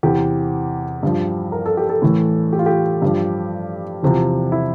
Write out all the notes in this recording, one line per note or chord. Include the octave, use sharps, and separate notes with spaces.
E2 C3 E3 G4
G2 F3
A#4
A4
G4
A4
A2 E3
G4
F4
G4
G2 F3
E2 C3 F3
E4